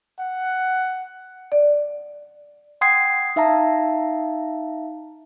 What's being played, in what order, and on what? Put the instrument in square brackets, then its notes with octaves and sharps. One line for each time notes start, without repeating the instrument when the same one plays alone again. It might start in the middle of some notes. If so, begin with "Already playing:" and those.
[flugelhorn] F#5
[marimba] D5
[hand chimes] F#5 G5 C6 D#6 G#6 C7
D#4 E5 F5 A5 A#5